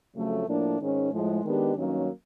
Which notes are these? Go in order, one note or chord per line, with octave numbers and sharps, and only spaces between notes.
F2 C#3 F#3 A3
A2 F3 A#3 D4
G#2 D#3 G#3 C#4
A2 F3 G#3
D#3 G#3 B3 D4 G4
G2 D#3 F#3 A#3 C#4